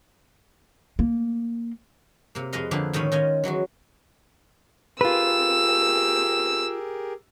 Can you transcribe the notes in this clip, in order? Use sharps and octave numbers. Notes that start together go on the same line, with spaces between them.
A#3
C3 A#3
F2 G#3 B4 D#5 F5
D3 F3 A#3 G4 G#4 B4
A2 D#3 G#3 C#4 B5
D#3 C#4 F4 D#5 G#5
E3 F#3 G#3 F#4
F4 G4 G#4 A#4 B4 E6